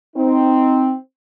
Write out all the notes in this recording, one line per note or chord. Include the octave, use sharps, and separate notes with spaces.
C4 D#4